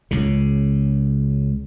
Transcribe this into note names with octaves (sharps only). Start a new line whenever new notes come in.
C#2 C#3